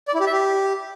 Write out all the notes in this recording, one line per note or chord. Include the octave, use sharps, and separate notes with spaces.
D5
E4
G4
E5
G4